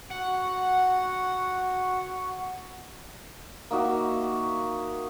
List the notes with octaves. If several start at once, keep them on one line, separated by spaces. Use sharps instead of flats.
F#4 F#5
A#3 D#4 F#4 E5